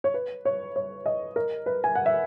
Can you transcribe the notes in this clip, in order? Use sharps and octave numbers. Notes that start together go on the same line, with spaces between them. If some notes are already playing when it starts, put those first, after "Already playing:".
C#5
B4
C#5
C#5
D#5
A#4
B4
G#5
F#5
E5